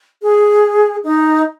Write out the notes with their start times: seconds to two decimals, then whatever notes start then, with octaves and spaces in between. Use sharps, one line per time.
0.22 G#4
1.04 D#4